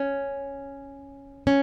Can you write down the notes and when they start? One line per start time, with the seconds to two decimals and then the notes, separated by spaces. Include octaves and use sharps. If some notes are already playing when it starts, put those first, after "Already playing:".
Already playing: C#4
1.47 C#4